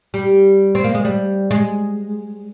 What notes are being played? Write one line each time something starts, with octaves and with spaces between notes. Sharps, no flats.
G3
C4
A#3
G#3
G3
G#3